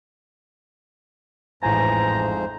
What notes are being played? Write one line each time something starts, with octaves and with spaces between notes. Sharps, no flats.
A1 F2 G#2 C5 G#5 A#5